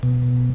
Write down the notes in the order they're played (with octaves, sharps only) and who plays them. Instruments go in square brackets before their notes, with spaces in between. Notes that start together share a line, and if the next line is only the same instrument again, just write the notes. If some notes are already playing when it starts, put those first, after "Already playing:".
[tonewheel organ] B2